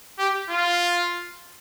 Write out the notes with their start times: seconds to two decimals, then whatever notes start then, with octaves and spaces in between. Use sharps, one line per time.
0.18 G4
0.49 F4